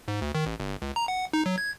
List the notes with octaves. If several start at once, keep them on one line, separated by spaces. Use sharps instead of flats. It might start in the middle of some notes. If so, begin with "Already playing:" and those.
G#2
D2
D#3
A1
G1
C#2
A#5
F#5
D#4
F#3
G#6